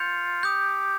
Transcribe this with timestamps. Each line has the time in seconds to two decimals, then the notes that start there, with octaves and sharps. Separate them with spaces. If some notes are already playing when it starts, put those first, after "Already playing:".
Already playing: F4 G6 C#7 F7
0.43 G4 D#6 G6